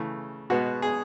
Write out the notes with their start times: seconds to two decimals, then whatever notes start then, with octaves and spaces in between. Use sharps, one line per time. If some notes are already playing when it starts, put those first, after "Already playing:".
Already playing: C#3 E3 A3
0.50 B2 G#3 B3 F#4
0.82 G#4